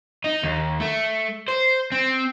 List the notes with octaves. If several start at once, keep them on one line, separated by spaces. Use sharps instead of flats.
D#4
D#2
A3
C5
C4